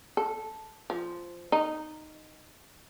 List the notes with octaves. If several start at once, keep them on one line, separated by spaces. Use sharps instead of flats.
A4
F3
D#4